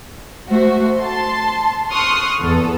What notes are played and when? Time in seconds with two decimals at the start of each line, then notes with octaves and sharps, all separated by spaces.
0.48 A3 F#4 C5
0.99 A5 C6
1.89 C6 C#6 D#6 F6 F#6
2.41 E2 B3 A4